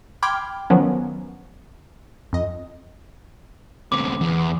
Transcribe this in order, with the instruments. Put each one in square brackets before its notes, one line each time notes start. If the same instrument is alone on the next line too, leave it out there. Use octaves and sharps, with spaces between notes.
[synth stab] G5 B5 C6 D6 F6 G#6
D#3 F3 F#3 B3 C#4
F2 D#5
[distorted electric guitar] D2 C3 [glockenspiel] D6
[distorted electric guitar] E2